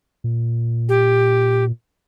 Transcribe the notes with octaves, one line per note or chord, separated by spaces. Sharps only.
A#2
G4